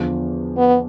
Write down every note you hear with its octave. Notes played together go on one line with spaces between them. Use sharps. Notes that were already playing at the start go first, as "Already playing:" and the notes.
Already playing: E2 D3 F3
B3